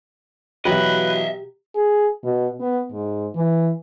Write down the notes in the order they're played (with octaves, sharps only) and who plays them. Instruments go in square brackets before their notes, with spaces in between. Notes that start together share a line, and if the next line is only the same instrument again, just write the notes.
[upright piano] B2 E3 F#3 [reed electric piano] G4 [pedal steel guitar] B4 [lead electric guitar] D#5 E5
[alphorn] G#4
B2
B3
G#2
E3